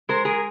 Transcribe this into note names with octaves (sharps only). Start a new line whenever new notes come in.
G#3 A#4 C5
G#4 A#4